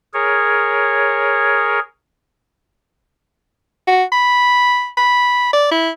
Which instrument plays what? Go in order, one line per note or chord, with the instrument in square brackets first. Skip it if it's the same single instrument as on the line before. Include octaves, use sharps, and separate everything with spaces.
[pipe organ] G#4 A#4 C#5
[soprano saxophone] F#4
B5
B5
D5
E4